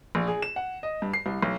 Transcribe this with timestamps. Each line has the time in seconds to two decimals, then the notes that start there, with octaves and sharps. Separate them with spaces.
0.15 A#1
0.27 G#4
0.42 E7
0.56 F#5
0.83 D#5
1.02 G2
1.14 C7
1.26 C2
1.43 B1